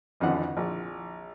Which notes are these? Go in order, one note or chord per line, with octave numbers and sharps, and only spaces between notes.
G#1 F2 D3 E3 F#5
A#1